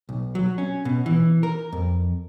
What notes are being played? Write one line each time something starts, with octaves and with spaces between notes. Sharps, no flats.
B1
F#3
C#4
B2
E3
A#4
F2